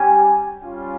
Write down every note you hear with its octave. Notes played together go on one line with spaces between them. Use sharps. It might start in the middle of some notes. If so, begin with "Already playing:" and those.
Already playing: G3 C#4 G4 G#5
G3 C#4 F4